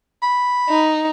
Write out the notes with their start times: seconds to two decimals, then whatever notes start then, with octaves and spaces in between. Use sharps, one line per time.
0.23 B5
0.69 D#4